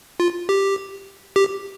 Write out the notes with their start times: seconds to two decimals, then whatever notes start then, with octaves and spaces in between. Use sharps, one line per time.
0.20 F4
0.49 G4
1.36 G4